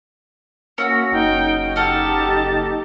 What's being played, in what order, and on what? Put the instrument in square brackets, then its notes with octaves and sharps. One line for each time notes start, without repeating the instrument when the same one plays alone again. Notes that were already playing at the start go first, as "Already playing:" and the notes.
[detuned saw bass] A#3 [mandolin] C#4 F#4 [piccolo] E6
[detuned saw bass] F#1 [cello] D#4 [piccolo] G5
[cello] D#4 G4 [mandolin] A4 F#5 F6 [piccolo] A5